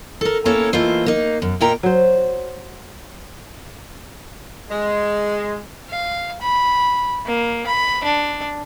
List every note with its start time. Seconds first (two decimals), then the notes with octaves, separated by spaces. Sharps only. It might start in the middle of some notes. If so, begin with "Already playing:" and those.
0.21 A4 A#4
0.45 A#3 C#4 E4 A4 C#5
0.73 E3 A3 A#3 F4 C5 D#5
1.06 A#3 D#4
1.42 F#2
1.61 A#2 D#4 A#4 E5 G5 A#5
1.83 F#3 C5
4.70 G#3
5.89 F5
6.41 B5
7.26 A#3
7.66 B5
8.04 D4